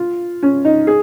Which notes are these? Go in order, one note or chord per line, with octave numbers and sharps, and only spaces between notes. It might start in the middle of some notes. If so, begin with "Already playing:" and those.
Already playing: F4
C#4
D#4
G#4